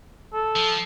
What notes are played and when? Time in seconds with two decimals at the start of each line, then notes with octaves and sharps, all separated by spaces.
0.34 A4
0.56 F3